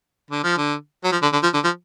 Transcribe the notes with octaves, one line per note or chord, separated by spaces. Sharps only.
D3
F3
D3
F#3
F3
D3
D3
F3
D3
F3